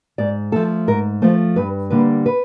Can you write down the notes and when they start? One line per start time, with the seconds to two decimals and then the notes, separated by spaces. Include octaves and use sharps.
0.18 G#2 D5
0.52 F3 A3 A4
0.88 G#2 A#4
1.22 F3 A3 C5
1.56 G2 B4
1.90 D3 G3 A#3 B4
2.26 B4